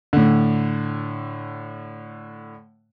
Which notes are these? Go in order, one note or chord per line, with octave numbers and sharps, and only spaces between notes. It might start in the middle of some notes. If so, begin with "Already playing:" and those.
A2 D3